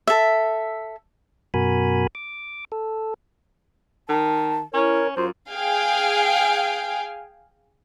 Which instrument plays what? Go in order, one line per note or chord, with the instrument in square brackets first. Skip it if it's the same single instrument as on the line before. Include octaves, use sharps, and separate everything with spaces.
[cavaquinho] A4 E5
[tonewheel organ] F#2 B2 F#4 A#4 G#5 B5
D6
A4
[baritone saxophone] D#3 [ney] A5
[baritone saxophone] C#4 [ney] E4 [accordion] A#4 C#5
[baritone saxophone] F#2 [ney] F4 [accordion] C5
[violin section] G#4 F5 G5 G#5